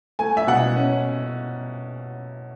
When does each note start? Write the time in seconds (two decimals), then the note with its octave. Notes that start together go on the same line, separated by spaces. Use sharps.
0.19 A3 G#5
0.37 E5
0.47 B2 F#5
0.76 C#4